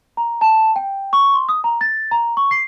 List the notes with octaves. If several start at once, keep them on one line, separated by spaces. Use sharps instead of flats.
A#5
A5
G5
C#6
C6
D#6
A#5
A6
A#5
C#6
C7